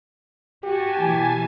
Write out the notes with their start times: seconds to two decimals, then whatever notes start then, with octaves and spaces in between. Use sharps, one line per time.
0.64 F#4 G4 G#5 A5
1.01 B2 E3